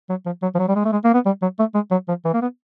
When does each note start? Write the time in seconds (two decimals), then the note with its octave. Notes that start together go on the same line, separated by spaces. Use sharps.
0.10 F#3
0.26 F3
0.42 F#3
0.55 F3
0.59 F#3
0.68 G3
0.76 G#3
0.85 A3
0.92 G#3
1.04 A#3
1.14 B3
1.26 G3
1.42 F#3
1.59 A3
1.74 G#3
1.91 F#3
2.08 F3
2.25 E3
2.33 A#3
2.42 B3